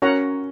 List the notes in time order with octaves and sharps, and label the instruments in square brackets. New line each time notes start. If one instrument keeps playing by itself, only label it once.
[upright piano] C#4 [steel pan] F#4 A#4 C#5 F#5 A#5